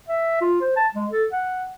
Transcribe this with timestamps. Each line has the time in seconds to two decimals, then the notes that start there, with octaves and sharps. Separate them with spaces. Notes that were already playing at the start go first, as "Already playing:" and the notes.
0.08 E5
0.41 F4
0.61 C5
0.76 A5
0.95 G#3
1.11 A4
1.32 F#5